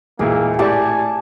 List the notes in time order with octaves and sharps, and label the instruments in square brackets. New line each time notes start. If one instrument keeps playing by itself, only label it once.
[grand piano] E1 A#2 E4 [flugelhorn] A#3 [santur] G#4
[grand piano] A2 D6 [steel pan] G4 D5 [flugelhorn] G#5 [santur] A5 C#6